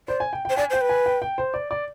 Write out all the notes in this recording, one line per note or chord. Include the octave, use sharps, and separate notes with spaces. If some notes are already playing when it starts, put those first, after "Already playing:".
C5 D5
G#5
G5
C5 G5
D5 G#5
C5 G5
B4
G#5
G5
G5
C5
D5
D5